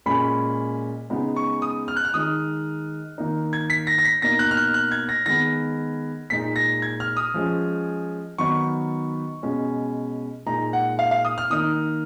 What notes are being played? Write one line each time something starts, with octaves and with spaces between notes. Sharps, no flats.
A#2 G#3 C#4 B5
C#3 G#3 B3 D#4
C#6
D#6
F6
F#6
F6
D#3 G#3 D#4 D#6
D#3 A#3 D#4
G#6
B6
A#6
A#6
B6
B2 A#3 D#4 A#6
F#6
F6
F#6
F#6
G#6
A#6
D#3 G#3 B3 A#6
A#2 G#3 D#4 B6
A#6
G#6
F6
D#6
F3 G#3 C#4
D#3 F#3 B3 D#4 C#6
B2 G#3 C#4
A#2 G#3 D#4 A#5
F#5
F5
F5
D#6
F6
D#3 A#3 D#4 D#6